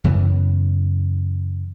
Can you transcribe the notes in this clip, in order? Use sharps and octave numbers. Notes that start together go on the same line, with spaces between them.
F#2 C#3 E3 B3